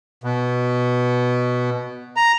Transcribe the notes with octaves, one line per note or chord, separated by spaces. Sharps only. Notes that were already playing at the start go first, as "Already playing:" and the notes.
B2
A#5